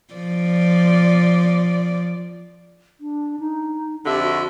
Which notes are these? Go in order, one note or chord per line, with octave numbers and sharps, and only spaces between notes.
F3 D5
D4
D#4
F2 D3 G4 E5
F#4